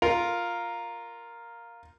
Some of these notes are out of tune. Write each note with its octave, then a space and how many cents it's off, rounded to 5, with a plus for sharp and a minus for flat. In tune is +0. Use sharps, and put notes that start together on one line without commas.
F4 +0 A#4 +0